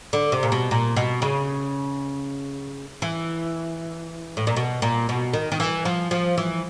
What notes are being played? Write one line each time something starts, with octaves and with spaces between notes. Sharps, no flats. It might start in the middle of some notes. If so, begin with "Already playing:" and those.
D3
C3
A#2
B2
A#2
B2
C#3
E3
A2
A#2
B2
A#2
B2
D#3
D#3
E3
F3
F3
E3